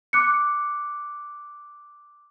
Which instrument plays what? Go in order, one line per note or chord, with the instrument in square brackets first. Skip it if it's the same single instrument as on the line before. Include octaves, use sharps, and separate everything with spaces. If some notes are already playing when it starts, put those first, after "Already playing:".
[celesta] D6 F#6 C#7